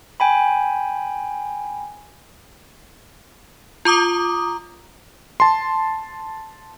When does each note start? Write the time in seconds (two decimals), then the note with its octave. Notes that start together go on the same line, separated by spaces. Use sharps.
0.20 G5 G#5 B5
3.85 F4 A#5 D6 D#6
5.40 A5 C6